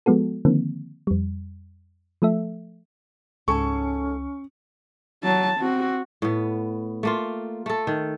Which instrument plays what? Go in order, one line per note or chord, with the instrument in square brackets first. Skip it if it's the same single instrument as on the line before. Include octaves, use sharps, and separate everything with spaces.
[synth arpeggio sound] F3 G#3 B3 F#4 A4
D3 D#3 F3 A#3 C4
F2 G3
F3 A3 A4 E5
[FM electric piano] C#2 [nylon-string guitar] G#2 A4 G#5 [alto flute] C#4 [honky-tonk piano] C#6
[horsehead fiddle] F#3 A5
C4 F#4
[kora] A2 B3
A3 A#3 F4
A3 A4
D#3